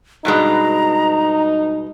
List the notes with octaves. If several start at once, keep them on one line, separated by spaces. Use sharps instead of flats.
G2 B2 G#3 D#4 A#5